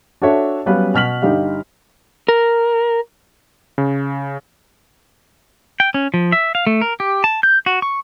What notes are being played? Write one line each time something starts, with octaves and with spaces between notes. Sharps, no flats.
D4 F#4 A4 C#5 E5
F#3 G3 B3 C#4 B4 F5
B2 F6 B6 F#7
G1 D#4 G4 F5
A#4
C#3
G5
C#4
F3
E5
F5
A3
A#4
G4
A5
G6
F#4
C#6